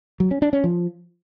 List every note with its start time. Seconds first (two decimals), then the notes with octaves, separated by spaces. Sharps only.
0.20 F#3
0.31 C#4
0.42 D4
0.53 C#4
0.64 F3